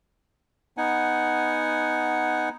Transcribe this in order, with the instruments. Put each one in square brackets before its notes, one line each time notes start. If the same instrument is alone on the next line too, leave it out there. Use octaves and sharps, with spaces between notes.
[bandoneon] B3 D#4 F#5 G#5